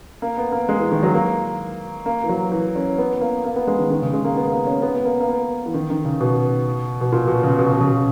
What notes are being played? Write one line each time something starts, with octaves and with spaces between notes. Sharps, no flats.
A#3
B3
A#3
G#3
E3
D#3
F#3
A#3
A#3
E3
F#3
E3
C#4
B3
A#3
A#3
B3
G#3
D#3
D#3
C#3
G#3
A#3
B3
A#3
C#4
B3
B3
A#3
A#3
B3
E3
D#3
D#3
C#3
B2
B2
A#2
B2
C#3
B2
C#3
B2
C#3
B2